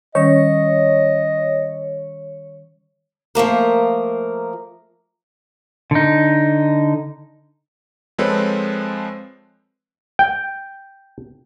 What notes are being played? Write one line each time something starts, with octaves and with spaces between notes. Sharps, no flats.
D#3 G3 C#4 C#5 D#5
F3 A3 A#3 A#4
D3 D#4
F3 G#3 C4 A4 B4 C#5
G5